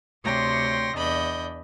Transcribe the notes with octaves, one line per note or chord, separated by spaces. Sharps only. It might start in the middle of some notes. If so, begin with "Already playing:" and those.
D2 C3 C#5 G5 C6 A#6
E2 D4 D#5 B5 G6